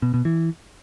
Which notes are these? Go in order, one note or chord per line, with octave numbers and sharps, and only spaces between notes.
B2
B2
E3